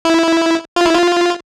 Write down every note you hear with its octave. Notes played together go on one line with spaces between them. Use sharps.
E4
F4
E4
F4